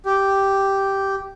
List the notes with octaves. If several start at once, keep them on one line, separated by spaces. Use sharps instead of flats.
G4